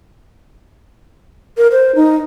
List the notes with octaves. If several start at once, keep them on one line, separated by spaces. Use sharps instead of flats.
A#4
C5
D#4